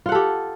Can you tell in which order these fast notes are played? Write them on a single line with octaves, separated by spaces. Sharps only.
F4 F#5 A4 G4